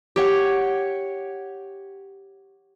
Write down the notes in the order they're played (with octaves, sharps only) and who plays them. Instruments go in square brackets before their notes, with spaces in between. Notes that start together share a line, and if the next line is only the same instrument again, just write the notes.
[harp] G4 C#5 F#5